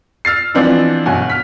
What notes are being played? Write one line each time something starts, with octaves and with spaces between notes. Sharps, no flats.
E6 F6 A6 C7
E3 F3 B3 C4 D4 D#4
G1 B2 F#3 F#4 G#5
F6 B6